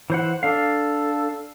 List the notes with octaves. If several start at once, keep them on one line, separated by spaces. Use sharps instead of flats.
E3 C5 F#5
D4 A4 F5